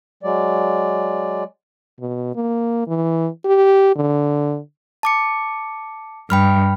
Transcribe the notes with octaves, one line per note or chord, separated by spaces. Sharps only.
F#3 G#3 D5
B2
A#3
E3
G4
D3
A5 D6 C#7
G2 G5 B5 F6